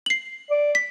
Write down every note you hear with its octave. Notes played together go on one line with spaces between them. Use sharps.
C7 F#7
D5
B6